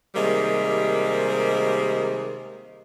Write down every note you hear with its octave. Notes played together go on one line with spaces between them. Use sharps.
C3 D#3 G3 G#3 A#3